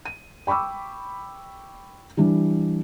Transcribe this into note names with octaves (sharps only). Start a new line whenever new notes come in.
D#7
G5 B5 C#6 D6 E6
E3 G3 D4